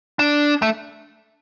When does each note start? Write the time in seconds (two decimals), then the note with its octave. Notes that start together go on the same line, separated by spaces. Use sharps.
0.19 D4
0.62 A3